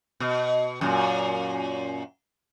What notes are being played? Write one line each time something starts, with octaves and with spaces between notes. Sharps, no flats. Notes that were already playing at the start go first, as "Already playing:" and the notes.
B2
F#2 A#2